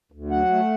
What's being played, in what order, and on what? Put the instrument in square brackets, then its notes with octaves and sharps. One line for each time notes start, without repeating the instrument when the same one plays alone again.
[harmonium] D2
F#3 F#5
A3